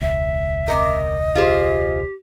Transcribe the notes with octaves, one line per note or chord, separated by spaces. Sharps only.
E1 C#2 E5
C3 A#4 D#5
F4 G4 G#4 C5